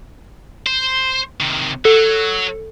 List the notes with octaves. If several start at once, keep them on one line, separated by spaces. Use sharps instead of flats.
C5
C3 D#3
F#3 A4